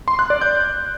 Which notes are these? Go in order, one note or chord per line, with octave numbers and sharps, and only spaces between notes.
C6
F#6
D5
G6